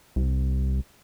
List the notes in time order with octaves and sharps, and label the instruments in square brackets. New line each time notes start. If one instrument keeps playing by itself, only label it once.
[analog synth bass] C2